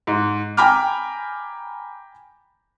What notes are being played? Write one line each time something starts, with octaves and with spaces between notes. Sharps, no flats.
G#2
G5 G#5 A#5 B5 D6 F6